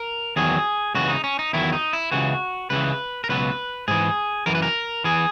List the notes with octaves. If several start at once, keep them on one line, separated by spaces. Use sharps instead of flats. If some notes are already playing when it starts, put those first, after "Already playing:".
Already playing: A#4
E2 D#3 F#3 G#4
C#2 C#3 E3 F#4
D#4
C#4
D#4
E2 D#3 F#3 E4
D#4
E4
C#2 C#3 E3 F#4
C#2 C#3 E3 B4
A#4
C#2 B2 F#3 B4
G#2 E3 G#4
F#2 E3 A#4
B4
A#4
E3 G#4